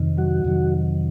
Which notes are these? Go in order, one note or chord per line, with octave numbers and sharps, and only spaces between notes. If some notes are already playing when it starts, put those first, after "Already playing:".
Already playing: F2 C3 D#3
F#3 F#4
F2 C3 D#3 F#3